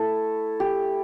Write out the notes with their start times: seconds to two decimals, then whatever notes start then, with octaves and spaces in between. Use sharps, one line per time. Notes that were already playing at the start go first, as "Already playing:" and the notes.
Already playing: A3 E4 A4
0.60 G4